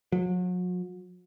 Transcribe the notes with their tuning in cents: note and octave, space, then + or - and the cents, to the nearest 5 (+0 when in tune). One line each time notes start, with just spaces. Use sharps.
F#3 -40